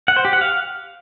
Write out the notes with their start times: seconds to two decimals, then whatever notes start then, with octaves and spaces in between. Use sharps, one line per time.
0.08 F#5
0.16 C5
0.25 G4
0.33 F#5
0.41 F5